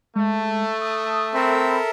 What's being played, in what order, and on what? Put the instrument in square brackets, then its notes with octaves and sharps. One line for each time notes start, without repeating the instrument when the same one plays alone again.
[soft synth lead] G#3 [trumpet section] A3
[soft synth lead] D#6
[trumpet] C4 [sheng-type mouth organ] A4 A#4 E5 [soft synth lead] B5